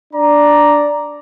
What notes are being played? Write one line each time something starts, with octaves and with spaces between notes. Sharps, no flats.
D4 D5 A#5